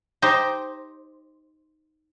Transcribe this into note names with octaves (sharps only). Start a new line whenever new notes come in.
D#4 G4 C5